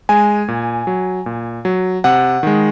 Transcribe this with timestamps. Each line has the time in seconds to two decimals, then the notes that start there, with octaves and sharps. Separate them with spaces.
0.09 G#3 G#5
0.48 A#2
0.87 F#3
1.26 A#2
1.65 F#3
2.04 C3 F#5
2.43 D#3 G#3